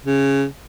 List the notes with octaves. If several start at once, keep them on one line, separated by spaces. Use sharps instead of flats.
C#3